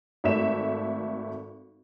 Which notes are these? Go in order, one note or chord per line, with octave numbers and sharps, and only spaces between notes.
G#1 A3 E5 E7